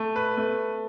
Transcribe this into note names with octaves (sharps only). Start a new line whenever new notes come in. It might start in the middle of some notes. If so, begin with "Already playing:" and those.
Already playing: A3
B4
A3